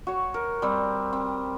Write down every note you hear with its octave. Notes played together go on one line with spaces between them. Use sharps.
F#4 C#5
A#4
G3 C4
C4